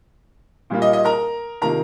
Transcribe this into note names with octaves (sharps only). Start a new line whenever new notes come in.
A#2 G3 A#3 F4
D#5
D#5
A#4 A#5
C3 D#3 A#3 F4 A#4 A#5